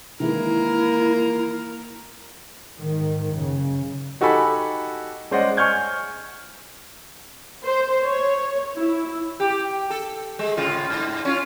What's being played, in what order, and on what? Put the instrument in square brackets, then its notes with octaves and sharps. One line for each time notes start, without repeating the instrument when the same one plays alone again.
[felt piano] D#3 E3 G#3 [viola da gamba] A#3 A#4 [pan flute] E4
[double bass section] G#2 D#3
F#1 C#3
[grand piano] D#4 F#4 G4 A4 G#5 B5
G#3 C#4 C5 D5 D#5 F#5
G#5 C#6 F6 G6 G#6
[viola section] C5
C#5
E4
[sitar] G4
A4
G#3
A2 C#3 F4
G#2
C#4 F4